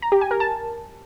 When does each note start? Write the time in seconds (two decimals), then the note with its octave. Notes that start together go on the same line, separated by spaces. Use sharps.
0.02 A#5
0.12 G4
0.21 G#5
0.31 A#4
0.40 A5